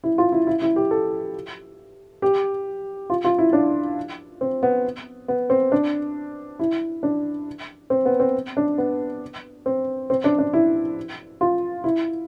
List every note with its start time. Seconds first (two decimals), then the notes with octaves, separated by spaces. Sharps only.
0.04 E4
0.18 F4
0.32 E4
0.47 E4
0.62 E4
0.76 G4
0.91 A4
2.22 G4
3.10 F4
3.24 F4
3.39 E4
3.53 D4
4.41 C4
4.63 B3
5.28 B3
5.50 C4
5.72 D4
6.59 E4
7.03 D4
7.90 C4
8.05 B3
8.20 C4
8.57 D4
8.78 B3
9.66 C4
10.10 C4
10.24 D4
10.39 D4
10.53 E4
11.41 F4
11.84 E4